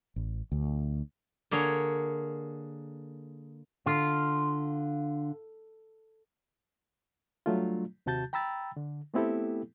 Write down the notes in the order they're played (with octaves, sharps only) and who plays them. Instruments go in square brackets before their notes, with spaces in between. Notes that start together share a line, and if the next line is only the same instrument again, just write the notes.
[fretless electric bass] A1
D2
[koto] D3 A#3 G#4 A#4 C#5
[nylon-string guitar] D3 [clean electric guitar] F4
[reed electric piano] F#3 G3 A3 D4 F4
D#2 C3 F#4 A5 G6 A6
G5 A#5 B5 E6 A6
D3
A3 B3 C4 E4 G4 A4